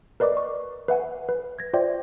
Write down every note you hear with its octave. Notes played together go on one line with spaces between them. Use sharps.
A#4 B4 D5 D#5 D6
C#6
B4 E5 F#5 G#5
B4
G#6 A#6
F4 C5 D5 E5 G5